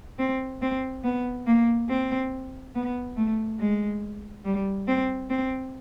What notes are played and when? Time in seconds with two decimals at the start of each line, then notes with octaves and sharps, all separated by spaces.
0.19 C4
0.62 C4
1.04 B3
1.47 A#3
1.89 C4
2.74 B3
3.17 A3
3.59 G#3
4.45 G3
4.87 C4
5.30 C4